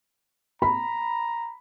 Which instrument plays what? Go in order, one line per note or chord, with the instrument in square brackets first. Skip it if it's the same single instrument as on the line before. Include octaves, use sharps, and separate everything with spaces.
[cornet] A#5 [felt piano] B5